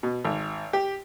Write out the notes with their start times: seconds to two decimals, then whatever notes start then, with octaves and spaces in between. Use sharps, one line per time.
0.03 B2
0.24 G#1
0.73 G4